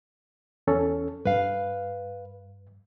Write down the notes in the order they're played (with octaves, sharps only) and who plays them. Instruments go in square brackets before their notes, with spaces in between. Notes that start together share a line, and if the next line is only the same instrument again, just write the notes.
[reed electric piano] E2 C#4 A4
[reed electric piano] G2 [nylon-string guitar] B4 F5